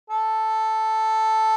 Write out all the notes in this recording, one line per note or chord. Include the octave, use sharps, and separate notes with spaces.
A4